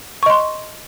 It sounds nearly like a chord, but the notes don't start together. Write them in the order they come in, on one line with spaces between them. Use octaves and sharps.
C#6 D#5 C6